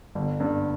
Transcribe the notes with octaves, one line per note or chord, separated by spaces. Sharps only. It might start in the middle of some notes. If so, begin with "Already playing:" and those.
G1
G2 D3